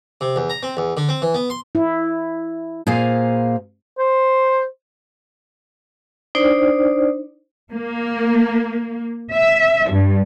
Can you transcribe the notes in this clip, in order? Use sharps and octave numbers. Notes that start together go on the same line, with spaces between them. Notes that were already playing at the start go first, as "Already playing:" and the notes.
C3
E2
A#5
C4
E2
D3
C4
E3
B3
C6
E4
A#2 G#4 C5 F5
C5
D4 D#4 C5 D5
A#3
E5
G2